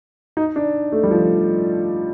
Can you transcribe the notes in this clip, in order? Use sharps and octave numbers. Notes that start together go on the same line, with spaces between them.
D#4
D4
A3
G3
F3